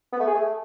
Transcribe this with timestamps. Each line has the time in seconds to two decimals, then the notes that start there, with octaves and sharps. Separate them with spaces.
0.13 B3
0.20 A3
0.28 G#4
0.35 A3